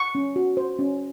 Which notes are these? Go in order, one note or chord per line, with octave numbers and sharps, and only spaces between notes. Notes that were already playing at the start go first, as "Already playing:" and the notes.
Already playing: C#6
C#4
F#4
C5
C#4